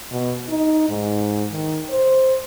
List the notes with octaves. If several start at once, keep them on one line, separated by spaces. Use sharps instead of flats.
B2
D#4
G#2
D#3
C5